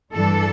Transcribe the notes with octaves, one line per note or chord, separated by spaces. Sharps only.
G2 E3 G3 D4 A4